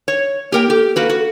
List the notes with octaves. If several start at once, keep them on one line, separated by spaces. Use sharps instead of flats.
C#5
A#3 G4 A#4 G5
G4 A4
A#3 F#4 B4
F#4